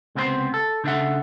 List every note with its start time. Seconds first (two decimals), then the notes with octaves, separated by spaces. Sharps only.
0.15 C#2 C3 B3 C4 A#4 C5
0.54 A4
0.84 C#3 D4 A4 E5 F#5